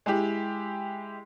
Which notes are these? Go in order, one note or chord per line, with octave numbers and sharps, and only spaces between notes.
G#3 E4 G4